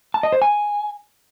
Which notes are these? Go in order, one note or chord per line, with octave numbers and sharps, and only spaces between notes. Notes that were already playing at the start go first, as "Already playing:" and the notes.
A5
D#5
C5
G#5